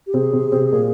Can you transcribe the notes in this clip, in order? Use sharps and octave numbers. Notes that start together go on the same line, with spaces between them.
G4
C3 C4 G#4
C3 C4
C3 C4
A#2 A#3